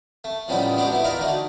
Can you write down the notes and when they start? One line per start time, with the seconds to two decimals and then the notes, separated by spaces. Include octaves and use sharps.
0.24 A3
0.48 A2 C#3 F3 G3 B3 D#4
0.76 G#3 B3 D4 D#4 F#4 G4
0.90 A3 B3 E4
1.04 D#4 F4 A#4 D5 E5 A#5
1.20 D3 A3 D#4 F#4